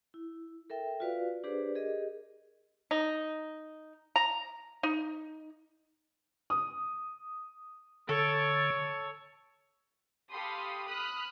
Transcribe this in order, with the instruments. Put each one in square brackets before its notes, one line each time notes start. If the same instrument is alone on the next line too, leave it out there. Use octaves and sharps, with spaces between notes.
[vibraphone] E4
A4 A#4 E5 G5
F4 F#4 B4 D5 F5
D4 G4 G#4 B4 C5 D5
G4 G#4 A#4 D#5
[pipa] D#4
A#5
D#4
[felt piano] D#6
[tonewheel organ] D3 [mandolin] A4 [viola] C#5
[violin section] G4 A4 F5 B5 C6 D#6
B5 D#6 F6 F#6 B6